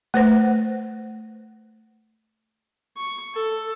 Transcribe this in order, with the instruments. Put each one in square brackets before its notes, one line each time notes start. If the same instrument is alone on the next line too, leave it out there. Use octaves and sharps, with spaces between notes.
[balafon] A3 B4 C5
[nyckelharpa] C#6
A4